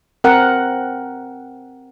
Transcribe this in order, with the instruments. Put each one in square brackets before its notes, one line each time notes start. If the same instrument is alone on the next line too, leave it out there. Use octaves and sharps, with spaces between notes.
[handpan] C4 A#4 F#5